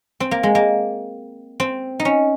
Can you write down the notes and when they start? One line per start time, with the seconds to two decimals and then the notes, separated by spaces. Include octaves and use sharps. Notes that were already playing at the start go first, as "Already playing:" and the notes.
0.20 C4
0.31 A#3
0.43 G#3
0.55 A#3
1.60 C4
2.00 D#4
2.05 C#4